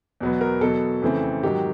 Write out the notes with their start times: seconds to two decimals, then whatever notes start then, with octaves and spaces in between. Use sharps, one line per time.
0.21 E2 B2 F#3 B3
0.41 A#4
0.61 E2 B2 F#3 A4
1.02 F2 C#3 E3 A3 C4
1.43 G#2 D#3 F#3 G4